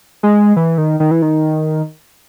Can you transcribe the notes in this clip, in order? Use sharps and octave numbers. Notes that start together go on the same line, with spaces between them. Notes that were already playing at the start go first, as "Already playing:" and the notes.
G#3
E3
D#3
D#3
E3
D#3